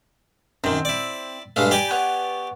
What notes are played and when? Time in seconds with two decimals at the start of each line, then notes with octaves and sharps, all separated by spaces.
0.64 F#2 D#3 C4
0.85 E4 D5
1.56 G2 G#3 A3 F5
1.71 G4 D5 G5 G#5 B5
1.91 B3 C#5 F#6